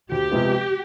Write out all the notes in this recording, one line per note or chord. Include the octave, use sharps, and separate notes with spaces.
D2 G4
C3 F3 G#3 B3